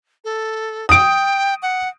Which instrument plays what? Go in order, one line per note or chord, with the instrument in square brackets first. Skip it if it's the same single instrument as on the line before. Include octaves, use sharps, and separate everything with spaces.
[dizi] A4
[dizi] G5 [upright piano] D#6 D7
[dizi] F#5